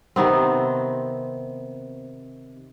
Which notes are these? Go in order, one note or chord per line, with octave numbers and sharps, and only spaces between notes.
C3 D#3 B3 C4